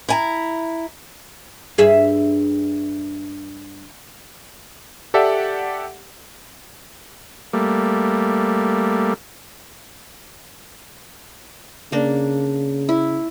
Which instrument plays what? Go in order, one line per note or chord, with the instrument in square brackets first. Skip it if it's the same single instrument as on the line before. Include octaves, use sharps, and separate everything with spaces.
[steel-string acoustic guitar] E4 G#5 A#5
[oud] G2 G#4 E5
[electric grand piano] G4 A4 D5 E5 F#5
[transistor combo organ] G3 A3 A#3
[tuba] C#3 [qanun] A#3 D4
[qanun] E4